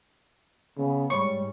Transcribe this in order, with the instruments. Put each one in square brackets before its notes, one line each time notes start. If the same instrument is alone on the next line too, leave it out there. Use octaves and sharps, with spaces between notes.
[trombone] C#3 [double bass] B3
[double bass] G#2 G3 [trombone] C#5 [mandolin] C#6